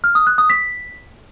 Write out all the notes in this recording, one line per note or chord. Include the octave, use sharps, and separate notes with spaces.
F6
D#6
F#6
D#6
B6